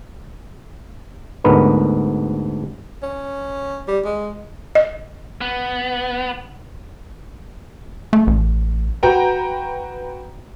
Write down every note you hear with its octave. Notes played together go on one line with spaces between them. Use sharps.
D2 G#2 B3 A#4 B4
C#4
G3
G#3
D#5
B3
A3
A1
F#4 B4 G5 A#5